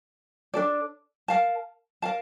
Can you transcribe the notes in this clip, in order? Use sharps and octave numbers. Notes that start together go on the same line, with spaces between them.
D4 A4 D5
A#4 F5 A5
A#4 F5 A5